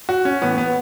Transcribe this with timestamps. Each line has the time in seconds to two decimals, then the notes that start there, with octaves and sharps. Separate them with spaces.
0.09 F#4
0.25 C#4
0.42 A2 E3 B3
0.58 B3